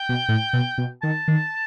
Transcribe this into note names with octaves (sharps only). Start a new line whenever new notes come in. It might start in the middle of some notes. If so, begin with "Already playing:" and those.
Already playing: G5
B2
A2
B2
B2
D#3 A5
D#3